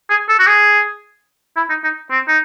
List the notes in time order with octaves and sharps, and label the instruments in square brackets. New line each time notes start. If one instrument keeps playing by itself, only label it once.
[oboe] G#4
A4
F#4
G#4
E4
D#4
D#4
C4
D#4